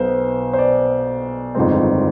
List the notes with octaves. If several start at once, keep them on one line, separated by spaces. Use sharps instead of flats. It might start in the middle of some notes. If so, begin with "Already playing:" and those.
Already playing: B1 B2 B3 C5
C5
D5
G1 F2 D#3 G#3 C4